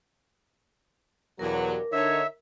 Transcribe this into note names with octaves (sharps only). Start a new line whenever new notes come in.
E2 G2 B2 F#3 A#4 D6
D3 D#4 C#5 E5